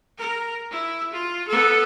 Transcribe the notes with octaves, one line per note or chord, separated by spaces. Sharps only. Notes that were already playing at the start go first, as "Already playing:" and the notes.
A#4
E4
F4
B3 A4